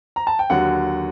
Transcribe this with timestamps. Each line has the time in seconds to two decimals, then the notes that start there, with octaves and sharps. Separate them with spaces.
0.16 A#5
0.27 A5
0.39 G5
0.50 D#2 D3 F#3 F#5